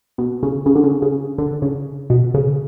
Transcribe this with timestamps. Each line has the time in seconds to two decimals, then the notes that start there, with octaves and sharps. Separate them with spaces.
0.18 B2
0.43 C#3
0.66 C#3
0.76 D3
0.84 C#3
1.02 C#3
1.38 D3
1.62 C#3
2.10 B2
2.34 C#3